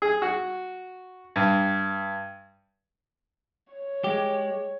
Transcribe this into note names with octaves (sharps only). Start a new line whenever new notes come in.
G#4
F#4
G2
C#5
G#3 G4